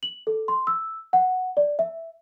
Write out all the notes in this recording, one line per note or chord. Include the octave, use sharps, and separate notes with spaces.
F#7
A4
C6
E6
F#5
D5
E5